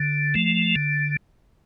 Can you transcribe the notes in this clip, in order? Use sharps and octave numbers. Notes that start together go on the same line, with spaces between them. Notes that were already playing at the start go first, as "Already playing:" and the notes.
Already playing: D3
F3 A3
D3